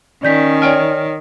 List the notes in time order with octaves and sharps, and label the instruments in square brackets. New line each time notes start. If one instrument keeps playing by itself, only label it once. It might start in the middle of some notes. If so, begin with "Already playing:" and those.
[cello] D#3 [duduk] C#4 [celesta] D5 G6 B6
[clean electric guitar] C#5 G5 G#5 [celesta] D5 F6